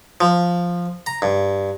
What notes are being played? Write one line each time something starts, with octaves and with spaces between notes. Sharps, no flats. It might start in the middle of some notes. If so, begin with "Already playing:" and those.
F3
A#5
G2